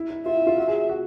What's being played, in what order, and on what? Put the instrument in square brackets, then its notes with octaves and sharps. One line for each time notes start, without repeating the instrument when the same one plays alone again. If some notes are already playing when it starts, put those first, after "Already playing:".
Already playing: [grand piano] E4
E4
[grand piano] F4 [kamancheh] E5
[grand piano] E4
F4
F#4
G#4
F#4